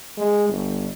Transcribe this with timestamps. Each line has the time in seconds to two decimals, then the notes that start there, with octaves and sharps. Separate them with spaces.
0.17 G#3
0.49 G1